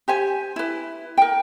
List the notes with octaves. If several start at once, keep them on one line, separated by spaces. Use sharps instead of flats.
G4 C5 G#5
E4 B4
A#4 G5